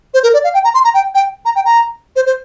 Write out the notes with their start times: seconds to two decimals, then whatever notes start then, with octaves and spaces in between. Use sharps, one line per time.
0.14 C5
0.23 A#4
0.34 D5
0.44 F5
0.54 G5
0.64 A#5
0.74 C6
0.84 A#5
0.94 G5
1.15 G5
1.45 A#5
1.56 G5
1.65 A#5
2.16 C5
2.26 C5